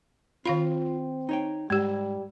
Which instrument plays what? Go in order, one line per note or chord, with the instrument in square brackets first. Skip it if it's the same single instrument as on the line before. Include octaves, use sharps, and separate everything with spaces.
[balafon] D#3 F5 B5 [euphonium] C4 [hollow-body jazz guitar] F4
[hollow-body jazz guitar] D#4 C#5 G5
[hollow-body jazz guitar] G#2 [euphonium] G3 [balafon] G#3 G4